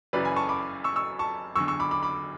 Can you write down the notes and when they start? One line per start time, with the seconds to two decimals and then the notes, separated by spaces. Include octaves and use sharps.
0.13 F#1 F#2 C#3 E3 B4 D5
0.25 G#5 B5
0.36 A5 C#6
0.49 B5 D6
0.84 C#6 E6
0.96 C#6 E6
1.19 A5 C#6
1.55 F#1 E2 D3 C#6 E6
1.68 C#6 E6
1.80 B5 D6
1.91 B5 D6
2.03 B5 D6